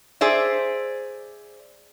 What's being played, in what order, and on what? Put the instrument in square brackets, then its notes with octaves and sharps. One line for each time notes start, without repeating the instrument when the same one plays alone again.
[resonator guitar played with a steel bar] G#4 C5 D5 E5